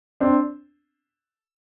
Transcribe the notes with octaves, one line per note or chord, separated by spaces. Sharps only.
C4 D4